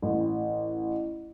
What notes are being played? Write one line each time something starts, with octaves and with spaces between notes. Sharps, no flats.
A1